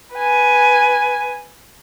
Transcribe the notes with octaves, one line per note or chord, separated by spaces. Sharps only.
B4 G#5